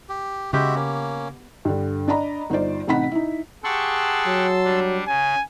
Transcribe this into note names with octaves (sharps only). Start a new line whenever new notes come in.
G4
C#3 G#3 B3 F#4 G4 E5
A#3 C#4
G2 D3
D4 D5 D#5 A#5 B5
G1 D#4 F4 C5 D5
A1 C3 D#4 F#5 B5 B6
D#4 E4
G4 G#4 F#5 A5 C6 C#6 E6
F#3
G3 D4
C#3 G#5